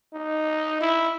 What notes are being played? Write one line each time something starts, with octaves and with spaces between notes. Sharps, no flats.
D#4
E4